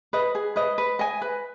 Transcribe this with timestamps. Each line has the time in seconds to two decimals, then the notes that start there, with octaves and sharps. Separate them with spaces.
0.13 B4 D#5
0.35 G#4
0.56 B4 D#5
0.78 B4
0.99 D#5 G#5
1.22 B4